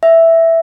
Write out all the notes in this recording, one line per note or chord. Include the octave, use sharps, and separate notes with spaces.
E5